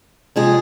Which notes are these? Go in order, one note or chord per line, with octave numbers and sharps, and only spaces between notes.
C3 F3 G#3 G#4